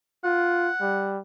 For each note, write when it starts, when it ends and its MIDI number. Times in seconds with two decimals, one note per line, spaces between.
0.24 0.70 65
0.24 1.17 78
0.81 1.20 55